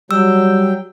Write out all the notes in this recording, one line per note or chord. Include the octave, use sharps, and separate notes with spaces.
F#3 G3 G5 E6